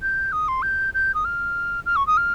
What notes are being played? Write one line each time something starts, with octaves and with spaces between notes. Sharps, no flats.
G6
D#6
C6
G6
G6
D#6
F6
F6
C#6
D#6
F6